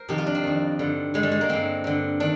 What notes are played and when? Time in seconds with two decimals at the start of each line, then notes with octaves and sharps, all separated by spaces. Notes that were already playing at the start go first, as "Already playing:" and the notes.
Already playing: A#4 C5
0.09 F2 C3 D#3 G4
0.18 F4
0.26 D4
0.35 C4
0.44 F2 D#3
0.79 G2 D3
1.14 G2 D3 G#3
1.23 G3
1.32 G#3
1.41 A#3
1.49 G2 D3 C4
1.84 G2 D3
2.20 D#3 D4